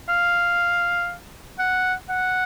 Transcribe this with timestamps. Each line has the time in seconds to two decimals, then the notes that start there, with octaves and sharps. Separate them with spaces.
0.09 F5
1.59 F#5
2.10 F#5